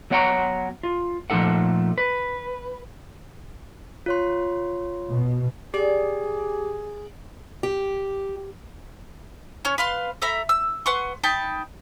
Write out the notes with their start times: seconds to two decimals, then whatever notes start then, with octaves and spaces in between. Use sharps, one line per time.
0.10 F#3 B3 C#5 F#5 G5 A#5
0.83 F4
1.30 A#2 F3 A3 D#4 A4 F#5
1.98 B4
4.06 F4 C#5 C6
5.12 B2
5.74 G4 G#4 D5
7.63 G4
9.65 C#4 C#5
9.78 B4 F5 C6
10.22 A4 E5 A#5 B5
10.49 E6
10.86 B4 F#5 C6 C#6
11.23 D#4 G5 A5 B5